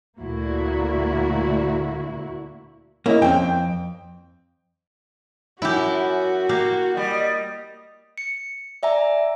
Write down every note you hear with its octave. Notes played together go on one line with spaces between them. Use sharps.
D2 A#2 A#3 E4 F#4
A#3 C#4 E4 D#5
F2 C4 G5
F#2 E4 F#4 G4
A#3 G4 F5
G3 D#5
C#7
D5 E5 G#5 A#5